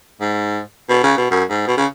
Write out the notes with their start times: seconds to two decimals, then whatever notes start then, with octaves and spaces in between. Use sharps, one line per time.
0.21 G#2
0.89 B2
1.04 C#3
1.17 B2
1.31 F#2
1.50 G#2
1.68 B2
1.77 C#3